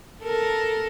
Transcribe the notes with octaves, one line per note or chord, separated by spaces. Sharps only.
A4 A#4